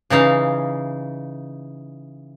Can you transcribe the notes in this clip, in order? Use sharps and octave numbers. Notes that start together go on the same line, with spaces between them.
C#3 E3 D#4 F5